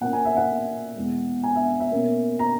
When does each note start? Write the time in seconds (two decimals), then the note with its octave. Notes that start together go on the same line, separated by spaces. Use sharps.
0.01 A#2 A#3 C#4 F#5
0.13 G#5
0.25 E5
0.37 F#5
0.96 E2 B2 G#3
1.43 G#5
1.56 E5
1.80 E5
1.91 B2 A#3 C#4
2.39 A#5